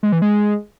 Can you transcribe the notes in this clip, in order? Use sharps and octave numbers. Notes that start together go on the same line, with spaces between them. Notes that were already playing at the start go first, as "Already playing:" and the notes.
G#3
E3
G#3